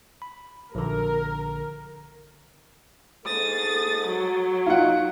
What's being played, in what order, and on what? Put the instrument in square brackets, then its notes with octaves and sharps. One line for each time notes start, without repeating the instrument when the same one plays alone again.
[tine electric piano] B5
[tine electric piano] A#1 D3 [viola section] A#4
[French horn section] G#2 G#3 A4 [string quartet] D#6 A6
[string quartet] F#3
[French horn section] D#4 [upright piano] F4 F#5